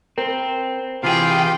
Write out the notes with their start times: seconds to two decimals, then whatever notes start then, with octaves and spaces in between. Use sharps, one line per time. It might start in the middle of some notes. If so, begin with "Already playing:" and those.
0.18 C4 A#4 C5
1.03 C3 E3 F4 G4 G#4 F5 G5